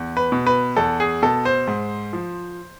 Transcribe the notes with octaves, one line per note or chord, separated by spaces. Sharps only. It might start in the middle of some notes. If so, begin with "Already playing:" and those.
Already playing: E2
B4
B2
B4
E2 A4
G#4
B2 A4
C5
G#2
F3